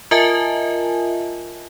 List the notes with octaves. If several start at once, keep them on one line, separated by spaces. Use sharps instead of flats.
F4 A#4 D#5 E5 G#5 A5